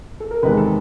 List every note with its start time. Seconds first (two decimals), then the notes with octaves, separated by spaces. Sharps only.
0.20 A4
0.31 A#4
0.43 E2 C3 D#3 G#3 B4
0.57 A4